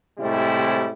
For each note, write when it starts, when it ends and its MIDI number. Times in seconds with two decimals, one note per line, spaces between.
0.18 0.90 45
0.18 0.90 48
0.18 0.90 55
0.18 0.90 56
0.18 0.90 60
0.18 0.90 64